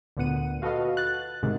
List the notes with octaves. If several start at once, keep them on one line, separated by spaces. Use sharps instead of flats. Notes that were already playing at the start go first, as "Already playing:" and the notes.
D2 A#2 B3 F#5 D#7
F4 F#4 A4 B4 D#5 F5
F#6 A6
G#2 C3 D#3